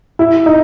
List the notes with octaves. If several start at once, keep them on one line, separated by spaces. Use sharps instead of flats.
E4
D#4